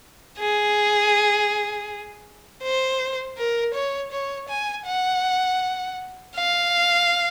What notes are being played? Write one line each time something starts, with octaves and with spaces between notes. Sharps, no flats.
G#4
C5
A#4
C#5
C#5
G#5
F#5
F5